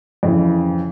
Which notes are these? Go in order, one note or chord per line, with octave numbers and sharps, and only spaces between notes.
F2 C#3 E3